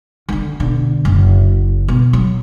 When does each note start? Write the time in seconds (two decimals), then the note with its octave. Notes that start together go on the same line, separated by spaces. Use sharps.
0.29 D3 D#3
0.60 B2 D3
1.05 F#1
1.88 B2
2.13 F#3